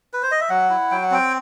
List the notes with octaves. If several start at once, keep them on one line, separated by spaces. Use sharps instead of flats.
B4
C5
D#5
E5
F#3 F#5
E4
F#3 G5
F#5
C4 G5